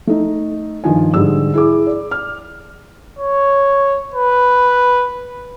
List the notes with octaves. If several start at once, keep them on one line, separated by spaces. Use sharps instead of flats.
A3 D#4
G2 D#3 F3 G#5
G#2 D3 G3 E6
E4 G#4 D6
D5
F6
C#5
B4